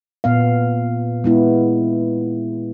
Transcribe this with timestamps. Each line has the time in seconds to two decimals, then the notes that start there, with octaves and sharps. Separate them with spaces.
0.24 A#2 B3 F5
1.24 G#3 B3 E4